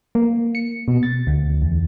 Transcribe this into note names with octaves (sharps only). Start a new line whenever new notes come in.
A#3
C#7
B2
A6
D2
E2